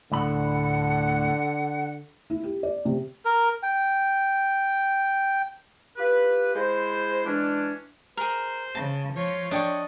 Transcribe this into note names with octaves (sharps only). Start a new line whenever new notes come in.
D2 A2 D3 F#5 B5
E4
G4
D5
C3
A#4
G5
F4 G4 B4
G#3 E4 C5
E3 G#3 C#4 D4
G#4 A#4 C5
C#3 A5
F3 F4 C#5
D4 D5 D#5 G5 C#6